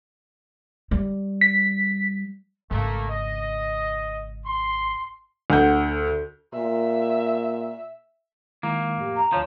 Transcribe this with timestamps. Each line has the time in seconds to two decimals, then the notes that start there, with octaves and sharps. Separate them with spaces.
0.91 G3
1.41 B6
2.71 G#1 C#3 A3 A#3
3.10 D#5
4.46 C6
5.50 D2 F#5 G6
6.54 A#2 E5
8.63 D#3 G#3 A#3 E4
8.97 F2 A2 G4
9.17 A#5
9.32 D2 F3 C#5 G6